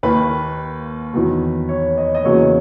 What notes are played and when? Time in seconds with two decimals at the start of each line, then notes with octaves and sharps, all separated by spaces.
0.03 D#2 D#3 A#3 B4
1.13 E2 D#3 F#3 B3
1.69 C#5
1.98 D#5
2.15 D#5
2.24 E2 C#3 F#3 A#3 C#5